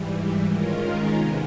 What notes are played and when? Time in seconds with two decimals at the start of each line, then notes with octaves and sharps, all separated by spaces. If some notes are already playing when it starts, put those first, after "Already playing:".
Already playing: G#2 E3 G3
0.45 D#3 G#3 C#4 F4 A#4
1.14 C3 D#3 G#3 B3